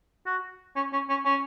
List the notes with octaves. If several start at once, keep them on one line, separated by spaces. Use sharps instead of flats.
F#4
C#4
C#4
C#4
C#4